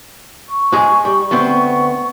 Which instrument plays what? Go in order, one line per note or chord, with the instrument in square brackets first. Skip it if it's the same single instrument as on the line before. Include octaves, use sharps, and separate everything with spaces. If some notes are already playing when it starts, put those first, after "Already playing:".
[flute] C#6
[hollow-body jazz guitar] G#2 G#3 G#4
G3
D2 B3 C4